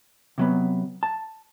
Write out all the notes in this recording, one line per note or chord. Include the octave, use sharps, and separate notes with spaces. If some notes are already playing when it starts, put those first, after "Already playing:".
C3 F#3 B3
A5